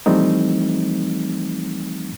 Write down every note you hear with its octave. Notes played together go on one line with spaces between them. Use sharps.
E3 F3 G3 A3 C4 D#4